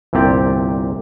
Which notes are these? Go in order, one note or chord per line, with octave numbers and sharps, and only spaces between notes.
G1 C2 A#2 C4 G4 D5